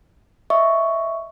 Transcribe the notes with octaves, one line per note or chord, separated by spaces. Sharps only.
D#5 E5 C#6